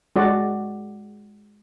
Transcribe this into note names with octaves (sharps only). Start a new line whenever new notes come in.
G#3 F#4 D5